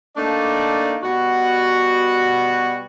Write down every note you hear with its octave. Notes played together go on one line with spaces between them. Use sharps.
A3 A#3 D4 D#4 D5
B2 G3 F#4